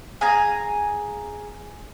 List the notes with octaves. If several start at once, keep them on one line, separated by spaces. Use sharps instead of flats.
G#4 F5 G#5 A#5